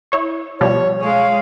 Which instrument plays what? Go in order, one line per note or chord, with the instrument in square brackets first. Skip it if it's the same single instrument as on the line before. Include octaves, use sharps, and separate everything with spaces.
[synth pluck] E4 C#5 C#6
[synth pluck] B2 F3 G3 [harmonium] C#5
[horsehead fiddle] G#3 F5 [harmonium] C#5